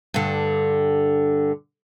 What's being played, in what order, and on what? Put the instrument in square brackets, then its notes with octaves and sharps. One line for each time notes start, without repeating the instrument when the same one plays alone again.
[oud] G2 D3